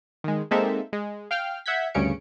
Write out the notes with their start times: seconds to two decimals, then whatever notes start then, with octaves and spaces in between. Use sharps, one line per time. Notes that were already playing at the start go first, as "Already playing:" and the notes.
0.24 D#3 G#3
0.51 G#3 A#3 C4 D#4 A4 E5
0.93 G#3
1.31 F5 G5 F6
1.66 E5 F#5 G6 G#6 B6
1.94 D2 G2 C#3 C#4 C#7 D7